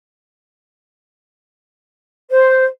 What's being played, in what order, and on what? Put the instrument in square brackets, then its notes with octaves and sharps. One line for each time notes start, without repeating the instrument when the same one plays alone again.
[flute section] C5